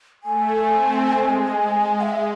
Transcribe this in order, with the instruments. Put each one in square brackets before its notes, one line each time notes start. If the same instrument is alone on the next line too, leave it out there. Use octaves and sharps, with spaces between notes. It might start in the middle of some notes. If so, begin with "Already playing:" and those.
[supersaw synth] A3 [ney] G#5
[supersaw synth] C4
G#3
[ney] E5